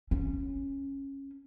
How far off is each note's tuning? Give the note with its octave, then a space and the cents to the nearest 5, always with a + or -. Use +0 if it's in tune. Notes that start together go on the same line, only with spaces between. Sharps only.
C#4 -15